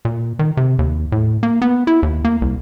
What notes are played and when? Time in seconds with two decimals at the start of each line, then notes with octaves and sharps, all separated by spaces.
0.05 A#2
0.39 D#3
0.57 C3
0.79 D#2
1.12 A2
1.43 A#3
1.62 B3
1.87 E4
2.03 D#2
2.25 A#3
2.42 C2